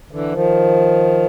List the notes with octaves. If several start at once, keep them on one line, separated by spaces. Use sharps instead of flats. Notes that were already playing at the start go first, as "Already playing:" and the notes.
D3 E3
D#3 F3